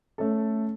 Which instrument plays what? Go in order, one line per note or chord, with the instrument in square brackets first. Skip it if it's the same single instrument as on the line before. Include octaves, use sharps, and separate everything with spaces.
[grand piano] A3 C#4 A4